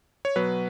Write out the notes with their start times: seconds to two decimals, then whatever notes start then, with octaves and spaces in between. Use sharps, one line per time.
0.25 C#5
0.36 B2 F#3 B4